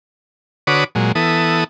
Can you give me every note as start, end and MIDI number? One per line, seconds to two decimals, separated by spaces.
0.67 0.84 50
0.67 0.84 66
0.67 0.84 71
0.67 0.84 73
0.67 0.84 86
0.67 0.84 87
0.95 1.12 46
0.95 1.12 54
0.95 1.12 56
1.15 1.64 52
1.15 1.64 59
1.15 1.64 69
1.15 1.64 87